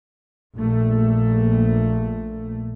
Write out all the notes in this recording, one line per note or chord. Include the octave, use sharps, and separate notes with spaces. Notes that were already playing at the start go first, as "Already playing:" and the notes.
A#1 A#2 A3